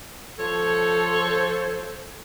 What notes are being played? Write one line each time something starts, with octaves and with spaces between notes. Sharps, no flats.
F3 A4 C5 C#5